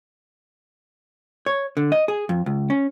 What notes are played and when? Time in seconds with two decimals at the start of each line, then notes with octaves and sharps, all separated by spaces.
1.46 C#5
1.77 D3
1.92 D#5
2.08 G#4
2.29 F2
2.46 C#2
2.70 C#4